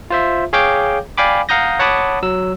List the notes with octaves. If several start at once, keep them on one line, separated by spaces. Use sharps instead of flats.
F4 C5 E5
G#4 C#5 F5 G5 D6 G6
D5 F5 G5 G#5 B5 D6
F5 F#5 A#5 D#6 G6 A#6
C#5 F#5 A5 B5 D6 D#6
F#3 E6